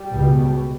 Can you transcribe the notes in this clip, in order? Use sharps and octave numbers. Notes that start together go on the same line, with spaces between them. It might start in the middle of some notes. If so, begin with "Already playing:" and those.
Already playing: G3
C#2 B2